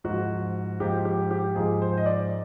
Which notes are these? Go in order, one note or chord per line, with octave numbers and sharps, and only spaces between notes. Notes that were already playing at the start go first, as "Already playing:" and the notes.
G#2 F3 F#4
G#2 F3 G4
G4
G4
G#2 F3 G#4
C5
D#5
D5